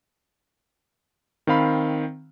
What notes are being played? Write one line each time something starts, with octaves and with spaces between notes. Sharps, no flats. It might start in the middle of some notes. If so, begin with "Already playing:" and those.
D#3 C4 F5 B5